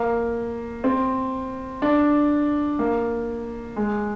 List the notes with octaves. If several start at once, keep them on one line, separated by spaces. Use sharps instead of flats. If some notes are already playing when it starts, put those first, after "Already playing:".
Already playing: A#3
C4
D4
A#3
G#3